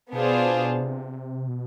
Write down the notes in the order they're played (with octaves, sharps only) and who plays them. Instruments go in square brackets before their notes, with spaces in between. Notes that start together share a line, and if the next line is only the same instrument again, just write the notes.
[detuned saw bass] B2 [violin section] B3 D4 F4 G#4 C5
[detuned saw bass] C3
B2